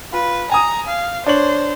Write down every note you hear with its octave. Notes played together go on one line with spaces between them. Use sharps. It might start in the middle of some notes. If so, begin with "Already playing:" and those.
F4 B4
G#5 A#5 D#6
F5
D4 C5 C#5 F#7